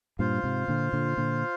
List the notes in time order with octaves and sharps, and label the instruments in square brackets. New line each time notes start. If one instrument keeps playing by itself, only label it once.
[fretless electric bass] G2 A#2 [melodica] F4 C5 F5
[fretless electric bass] G#2 C3
A#2 D3
A#2 D3
A#2 D3